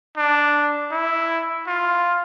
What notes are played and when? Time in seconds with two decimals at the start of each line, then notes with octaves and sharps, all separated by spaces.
0.18 D4
0.91 E4
1.67 F4